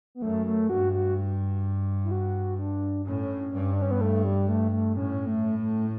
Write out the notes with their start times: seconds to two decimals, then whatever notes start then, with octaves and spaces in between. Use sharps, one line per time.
0.15 B3
0.22 F#2 A3
0.46 A3
0.69 G2 F#4
0.93 F#4
2.04 E4
2.11 F#4
2.59 D4
3.06 A2 C#4
3.53 G2
3.73 D4
3.82 C#4
3.91 B3
4.01 A3
4.24 G3
4.49 A3
4.71 A3
4.96 A2 C#4
5.27 A3
5.59 A3